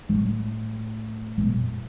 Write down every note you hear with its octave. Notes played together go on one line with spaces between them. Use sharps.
A2
B2
F2